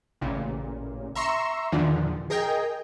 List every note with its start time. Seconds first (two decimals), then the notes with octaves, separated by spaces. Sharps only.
0.21 A1 A#2 C#3
1.15 E5 A#5 C6 C#6 E6
1.72 E2 A#2 D3 D#3 F3
2.30 G#4 A#4 D#5 G5